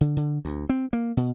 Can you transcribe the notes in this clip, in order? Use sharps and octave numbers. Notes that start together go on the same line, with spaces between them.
D3
D3
D2
C4
A#3
B2